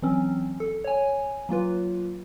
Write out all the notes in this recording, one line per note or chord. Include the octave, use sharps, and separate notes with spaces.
E3 F#3 C4 C#4
A4
C#5 G#5
F#3 A#3 F4 B4